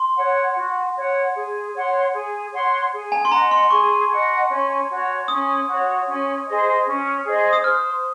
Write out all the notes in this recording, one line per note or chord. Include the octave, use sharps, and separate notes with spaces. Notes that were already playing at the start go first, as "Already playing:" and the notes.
Already playing: C6
C#5 F#5
F#4
C#5 F#5
G#4
C#5 F#5 C6
G#4
C#5 F#5 C6
G#4
G#5
C6
D#5 F#5 A#5
C6
G#4 C#6
D#5 F#5
C#4
F#4 C#5
C#4 D#6
F#4 C#5
C#4
G#4 C5 D#5
C#4
G#4 C5 D#5
D#6
C5 F6